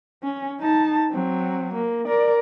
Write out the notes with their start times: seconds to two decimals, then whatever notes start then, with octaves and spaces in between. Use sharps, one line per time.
0.23 C#4
0.60 D#4 A5
1.12 F#3 C4
1.74 A#3
2.08 A#4 D5